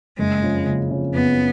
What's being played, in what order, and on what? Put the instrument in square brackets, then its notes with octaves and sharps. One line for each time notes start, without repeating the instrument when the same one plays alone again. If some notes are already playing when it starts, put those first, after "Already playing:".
[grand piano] F#1 [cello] G#3
[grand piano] F2 C#3
F#1
F2 C#3
[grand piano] F#1 [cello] B3